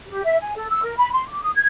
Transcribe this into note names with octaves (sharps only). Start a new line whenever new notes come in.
G4
E5
G#5
A4
E6
A#4
B5
C6
D6
D#6
G#6